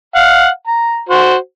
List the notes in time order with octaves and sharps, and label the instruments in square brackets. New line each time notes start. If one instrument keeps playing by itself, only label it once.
[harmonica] F5 F#5
A#5
F#4 C5